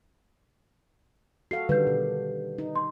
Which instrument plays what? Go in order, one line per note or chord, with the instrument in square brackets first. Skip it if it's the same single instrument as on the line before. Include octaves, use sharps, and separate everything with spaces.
[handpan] F#4 A4 F5 [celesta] C7
[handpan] D3 D#3 G3 [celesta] B4 G6
[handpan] B2
D#4
[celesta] C6